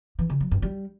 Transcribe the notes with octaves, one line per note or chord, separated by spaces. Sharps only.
E3
C#3
F#3
G2
G3